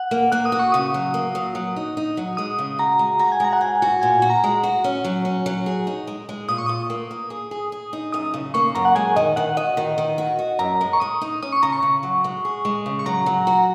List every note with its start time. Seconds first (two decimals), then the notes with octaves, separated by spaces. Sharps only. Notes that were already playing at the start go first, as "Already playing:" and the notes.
Already playing: F#5
0.11 A#3
0.32 A#3 F#6
0.45 D#6
0.52 F#4
0.59 C#6
0.72 C#3 D#6
0.94 F#3
1.14 A#3
1.35 F#3
1.55 F#3
1.76 D#4
1.97 D#4
2.17 F#3
2.37 G#3 D#6
2.58 C#3
2.79 F#4 A#5
2.99 G#3
3.19 F#4 A#5
3.32 G#5
3.40 G#3 A#5
3.53 F#5
3.61 G#2 G#5
3.82 F#4
4.01 A#2 G#5
4.22 F#4
4.30 A#5
4.44 G#3
4.63 F#4
4.84 C#4
5.05 F#3
5.25 C#4
5.46 F#3
5.66 G#4
5.87 D#4
6.07 G#3
6.29 G#3
6.48 A#2 D#6
6.58 C#6
6.66 A#2 D#6
6.90 A#3
7.11 A#3
7.30 G#4
7.51 G#4
7.72 G#4
7.93 D#4
8.12 F#2 D#6
8.34 C#3
8.54 A#3 C#6
8.75 F#2 A#5
8.85 F#5
8.95 G#3 G#5
9.16 D#3 D#5
9.36 D#3 F#5
9.57 F#4 D#5
9.77 D#3
9.98 D#3
10.18 F#4
10.39 F#4
10.59 F#2 A#5
10.81 G#3
10.93 C#6
11.00 G#3 D#6
11.21 D#4
11.42 C#4 D#6
11.52 C#6
11.63 C#3 A#5
11.73 C#6
11.83 C#3
12.03 F#3
12.24 G#3
12.45 G#4
12.65 G#3
12.86 C#3
12.99 C#6
13.06 F#3 A#5
13.26 F#3
13.47 F#4